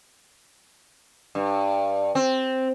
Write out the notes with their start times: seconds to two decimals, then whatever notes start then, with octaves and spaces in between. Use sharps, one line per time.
1.35 G2
2.15 C4